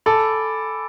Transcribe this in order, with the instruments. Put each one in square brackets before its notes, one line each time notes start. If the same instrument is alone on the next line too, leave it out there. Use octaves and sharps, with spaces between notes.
[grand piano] A4 [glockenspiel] G#5 B5 D6 A6 D7